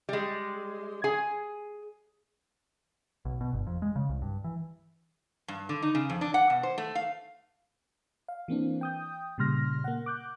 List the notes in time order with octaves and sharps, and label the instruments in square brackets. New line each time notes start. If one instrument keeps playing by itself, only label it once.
[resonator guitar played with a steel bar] G3 G#3
G#4 G#5
[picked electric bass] B1
B2
G1
F2
G#3
C#3
C2
G2
E3
[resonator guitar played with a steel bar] G2
D3
D#4
C#3
F2
D4
F#5
B2
C5
A3
F5
[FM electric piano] F5
E3 A#3 C4 D4
G5 D#6 G6
A#2 C#3 G3 C6 F6 A#6
A#3 F#5
D6 F#6 G6